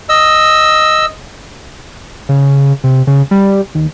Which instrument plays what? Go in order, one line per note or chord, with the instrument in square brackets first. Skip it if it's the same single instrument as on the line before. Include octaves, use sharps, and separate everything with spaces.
[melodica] D#5 E6
[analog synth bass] C#3
C3
C#3
G3
D#2